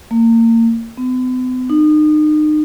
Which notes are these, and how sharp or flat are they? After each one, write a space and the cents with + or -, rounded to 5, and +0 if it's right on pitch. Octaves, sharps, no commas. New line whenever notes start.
A#3 -30
B3 +45
D#4 -35